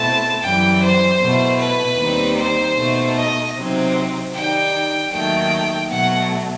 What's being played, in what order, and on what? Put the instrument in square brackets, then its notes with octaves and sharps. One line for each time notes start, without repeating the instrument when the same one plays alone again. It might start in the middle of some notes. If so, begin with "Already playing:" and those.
Already playing: [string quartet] B2 A3 C4 E4 [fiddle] A5
[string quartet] F#2 E3 G3 [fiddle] G5
[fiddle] C5
[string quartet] B2 A3 E4
[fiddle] B4
[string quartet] D#2 D#3 G3 C4 D#4
[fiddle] C5
[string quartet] B2 A3 D#4
[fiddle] D#5
[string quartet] C3 F#3 C4 D#4
[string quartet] D#3 G3 D#4 [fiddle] G5
[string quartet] D#2 D#3 F#3 A3 [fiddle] G5
[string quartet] B2 F#3 A3 [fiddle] F#5